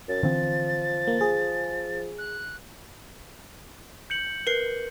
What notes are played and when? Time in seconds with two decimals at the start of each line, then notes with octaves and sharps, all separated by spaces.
0.09 F#2 A6
0.23 D3 E3 F3 C4
1.08 A#3
1.21 G#4
2.18 F#6
4.10 G6 C#7 F#7
4.47 A#4 B4 C7